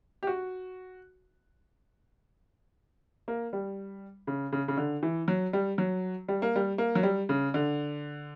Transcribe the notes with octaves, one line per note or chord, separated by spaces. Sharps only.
G4
F#4
A#3
G3
C#3
C#3
C#3
D3
E3
F#3
G3
F#3
G3
A#3
G3
A#3
F#3
G3
C#3
D3